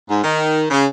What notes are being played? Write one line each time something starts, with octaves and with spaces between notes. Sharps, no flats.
G#2
D#3
C#3